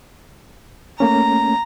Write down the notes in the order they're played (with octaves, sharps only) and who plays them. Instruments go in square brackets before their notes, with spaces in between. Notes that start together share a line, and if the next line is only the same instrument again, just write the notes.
[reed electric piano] A3 A#3 C#4 [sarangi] A#5